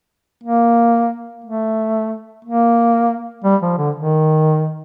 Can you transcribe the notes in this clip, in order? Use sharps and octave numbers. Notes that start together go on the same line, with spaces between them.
A#3
A3
A#3
G3
F3
D3
D#3